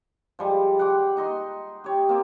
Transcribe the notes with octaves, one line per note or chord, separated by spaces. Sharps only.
F3 G3 G#3
F#5 G5 C6 D6
D#4 D#5 C6
G4 C#5
A#3 C4 G4